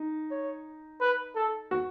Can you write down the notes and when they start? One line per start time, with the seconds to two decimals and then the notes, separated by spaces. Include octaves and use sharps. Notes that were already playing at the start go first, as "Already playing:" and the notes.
Already playing: D#4
0.31 C#5
1.01 B4
1.35 A4
1.71 F#4